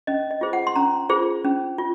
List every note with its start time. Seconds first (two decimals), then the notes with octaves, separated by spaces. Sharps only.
0.07 C#4 D#5
0.31 D#5
0.41 F4 G#4 C5
0.53 F#5
0.67 C6
0.76 C#4 A#5
1.09 F4 G#4 C5
1.45 C#4
1.78 F4